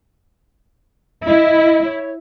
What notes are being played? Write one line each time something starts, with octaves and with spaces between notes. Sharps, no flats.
E4 D#5
C#5